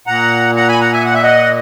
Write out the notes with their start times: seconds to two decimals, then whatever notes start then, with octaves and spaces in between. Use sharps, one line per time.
0.07 A#2 F#5 A#5
0.57 F#5 A#5
0.69 G#5 B5
0.80 F#5 A#5
0.93 E5 G#5
1.05 F#5
1.14 E5
1.22 D#5 F#5